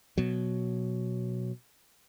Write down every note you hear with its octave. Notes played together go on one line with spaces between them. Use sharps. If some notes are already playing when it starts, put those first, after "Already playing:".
B2 F#3